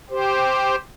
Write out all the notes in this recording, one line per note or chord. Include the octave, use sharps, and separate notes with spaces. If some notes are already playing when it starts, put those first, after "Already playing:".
G4 C5